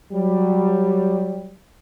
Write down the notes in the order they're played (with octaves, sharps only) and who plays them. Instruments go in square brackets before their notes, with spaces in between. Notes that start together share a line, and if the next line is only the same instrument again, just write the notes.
[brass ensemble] F#3 G3